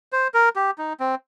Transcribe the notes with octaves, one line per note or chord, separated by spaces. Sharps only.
C5
A#4
G4
D#4
C4